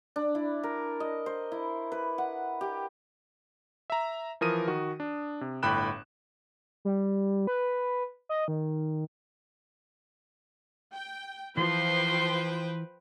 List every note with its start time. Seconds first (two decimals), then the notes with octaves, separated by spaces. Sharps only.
0.16 D4
0.35 E4
0.63 A#4
1.00 D#5
1.26 C5
1.52 E4
1.92 B4
2.18 F#5
2.61 G4
3.90 E5 A#5
4.41 E3 F3 A#4 D#6 D#7
4.67 D#3 F#4
5.00 D4
5.41 C3
5.63 G1 A2 G5 B5 F#6 E7
6.85 G3
7.47 B4
8.29 D#5
8.48 D#3
10.93 G5
11.57 E3 F3 B4 C5 G5 C6